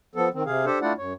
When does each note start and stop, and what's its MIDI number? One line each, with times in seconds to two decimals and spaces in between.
0.15 0.29 53
0.15 0.29 59
0.15 0.29 69
0.34 0.43 51
0.34 0.43 60
0.46 0.65 48
0.46 0.65 68
0.46 0.65 77
0.65 0.79 62
0.65 0.79 67
0.65 0.79 69
0.65 0.79 72
0.82 0.93 57
0.82 0.93 62
0.82 0.93 64
0.82 0.93 65
0.82 0.93 74
0.82 0.93 78
0.98 1.13 42
0.98 1.13 73